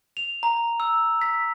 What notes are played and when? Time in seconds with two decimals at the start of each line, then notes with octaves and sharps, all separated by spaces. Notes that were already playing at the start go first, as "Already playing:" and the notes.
0.17 F7
0.43 A#5
0.80 E6
1.22 B6